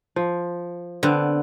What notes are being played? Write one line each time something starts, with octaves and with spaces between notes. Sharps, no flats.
F3
D3 B3 C4